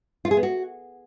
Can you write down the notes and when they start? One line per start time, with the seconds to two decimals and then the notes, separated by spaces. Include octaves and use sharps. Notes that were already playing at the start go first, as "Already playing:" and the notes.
0.25 F4
0.31 G#4
0.37 B3
0.43 F#4